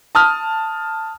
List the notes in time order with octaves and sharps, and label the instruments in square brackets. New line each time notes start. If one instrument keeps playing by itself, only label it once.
[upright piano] A5 D#6 F6